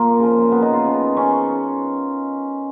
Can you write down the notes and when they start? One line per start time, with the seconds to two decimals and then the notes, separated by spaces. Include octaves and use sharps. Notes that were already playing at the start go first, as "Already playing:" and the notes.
Already playing: A#2 A#3 F4 A#4
0.19 C#3 F3
0.52 B3
0.62 D#4
0.73 F4
0.85 C#3 F3
1.17 C#4